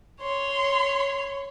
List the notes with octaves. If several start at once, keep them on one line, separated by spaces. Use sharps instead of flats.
C#5 C6